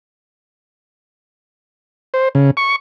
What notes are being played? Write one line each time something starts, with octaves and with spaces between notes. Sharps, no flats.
C5
C#3
C#6